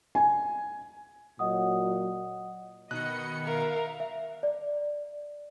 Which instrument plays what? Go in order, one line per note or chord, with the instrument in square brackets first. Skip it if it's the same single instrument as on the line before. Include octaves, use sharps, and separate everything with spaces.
[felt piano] G#5
[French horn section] A#2 F#3 [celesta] D#5 F#5 D#6
[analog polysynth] B2 D#3 C#7 [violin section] D#5 B5 [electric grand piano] F#6
[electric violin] A#4 [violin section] E5 F5
[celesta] E5
D5